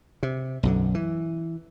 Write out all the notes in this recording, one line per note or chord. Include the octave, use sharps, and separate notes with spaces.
C3
B1 F#2 D3
E3